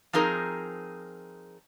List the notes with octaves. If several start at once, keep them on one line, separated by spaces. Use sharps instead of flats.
F3 C4 D#4 G#4 A#4